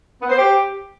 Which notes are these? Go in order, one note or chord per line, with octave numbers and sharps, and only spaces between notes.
B3
C5
G4